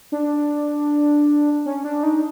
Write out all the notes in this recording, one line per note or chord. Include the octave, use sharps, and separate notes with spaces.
D4
C#4
D4
D#4